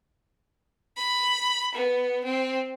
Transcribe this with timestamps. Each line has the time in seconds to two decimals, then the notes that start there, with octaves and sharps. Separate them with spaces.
0.96 B5
1.73 B3
2.24 C4